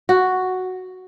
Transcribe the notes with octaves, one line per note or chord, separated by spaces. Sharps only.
F#4